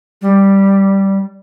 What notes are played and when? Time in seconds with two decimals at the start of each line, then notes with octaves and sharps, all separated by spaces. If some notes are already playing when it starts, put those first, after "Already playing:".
0.22 G3